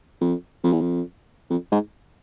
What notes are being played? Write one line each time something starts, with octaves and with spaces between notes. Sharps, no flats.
F2
F2
E2
F2
F2
G#2